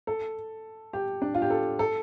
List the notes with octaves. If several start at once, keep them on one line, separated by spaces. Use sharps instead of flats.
A4
G4
D4
F4
G4
A4
A4